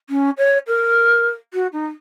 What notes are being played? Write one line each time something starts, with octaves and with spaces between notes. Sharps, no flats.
C#4
C#5
A#4
F#4
D#4